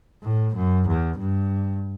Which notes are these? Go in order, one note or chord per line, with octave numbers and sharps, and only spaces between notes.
A2
F#2
E2
G2